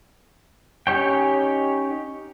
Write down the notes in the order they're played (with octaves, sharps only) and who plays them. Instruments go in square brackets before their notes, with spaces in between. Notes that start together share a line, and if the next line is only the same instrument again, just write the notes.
[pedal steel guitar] C#4 D#4 G4 C#5 G5